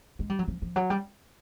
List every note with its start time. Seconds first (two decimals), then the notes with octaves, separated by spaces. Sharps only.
0.19 G#3
0.30 G3
0.39 F#3
0.48 F3
0.62 F3
0.76 F#3
0.90 G3